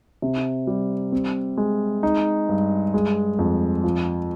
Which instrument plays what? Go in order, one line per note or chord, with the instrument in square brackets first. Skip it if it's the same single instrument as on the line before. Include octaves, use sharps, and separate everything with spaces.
[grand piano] C3
G3
C4
G#3
D#4
G2
G#3
F2
F3